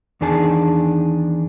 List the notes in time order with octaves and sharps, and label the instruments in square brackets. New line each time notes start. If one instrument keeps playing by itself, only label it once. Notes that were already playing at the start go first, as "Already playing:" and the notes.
[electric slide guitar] E2 D#3 D4 G#4 A5